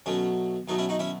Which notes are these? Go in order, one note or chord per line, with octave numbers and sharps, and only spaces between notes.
B2 F#3 A3 C#4
B2 F#3 A3 D#4
C#4 E4
D#4 F#4
C#4 E4